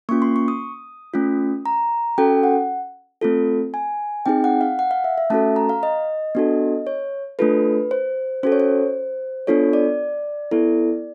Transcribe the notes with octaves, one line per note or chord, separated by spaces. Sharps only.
A#3 C#4 F4 C#6
C6
C#6
D#6
A3 C#4 F4
A#5
C#4 F#4 A4 G5
F#5
A3 C4 F4 A4
G#5
C4 D#4 G#4 G5
F#5
F5
F#5
F5
E5
E5
A3 C#4 F#4 A4 A5
A#5
F5
D#5
B3 D4 F#4 A4
C#5
A3 D4 F4 A4 B4
C5
C#4 F#4 A4 C5
C#5
C5
B3 D4 F4 A4 C#5
D5
B3 E4 A4